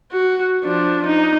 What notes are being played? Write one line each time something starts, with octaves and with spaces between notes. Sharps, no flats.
F#4
F3 D4
D#4